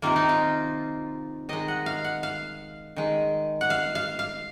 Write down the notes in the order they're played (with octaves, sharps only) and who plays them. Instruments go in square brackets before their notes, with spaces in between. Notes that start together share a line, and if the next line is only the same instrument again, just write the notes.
[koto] C3 D#3 A#3 F4
D#4
F4
D#3 G#3 D#5
F#5
F5
F#5
F5
D#3 G#3
F#5
F5
F5
F5